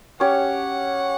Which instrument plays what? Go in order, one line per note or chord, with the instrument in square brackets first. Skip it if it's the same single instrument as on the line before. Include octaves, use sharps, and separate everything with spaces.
[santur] C#4 G4 C#5 [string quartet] F#5